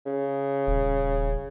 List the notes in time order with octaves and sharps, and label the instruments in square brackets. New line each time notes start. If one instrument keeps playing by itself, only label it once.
[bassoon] C#3
[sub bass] D#1